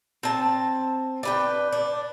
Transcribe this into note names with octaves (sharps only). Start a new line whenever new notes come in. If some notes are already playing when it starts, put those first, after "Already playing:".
C4 A5
D4 B4 G5
D4